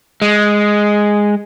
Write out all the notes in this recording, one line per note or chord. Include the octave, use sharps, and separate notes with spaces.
G#3